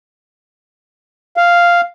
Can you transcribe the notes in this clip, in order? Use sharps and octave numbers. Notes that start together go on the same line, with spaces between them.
F5